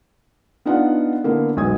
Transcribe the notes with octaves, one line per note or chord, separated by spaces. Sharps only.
B3 D4 D#4 F4 F#5
D3 A#3 B3 E4
E1 B1 B3 D#6 G#6